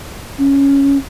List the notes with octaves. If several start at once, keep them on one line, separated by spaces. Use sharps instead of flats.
C#4